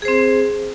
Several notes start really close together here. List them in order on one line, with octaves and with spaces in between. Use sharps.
G#4 C5 C4